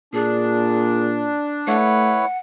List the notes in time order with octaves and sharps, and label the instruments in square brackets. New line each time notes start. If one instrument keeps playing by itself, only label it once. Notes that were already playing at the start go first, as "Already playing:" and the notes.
[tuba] A#2 [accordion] D4 [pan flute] G#4
[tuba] A3 [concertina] E4 B4 C#5 [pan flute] F#5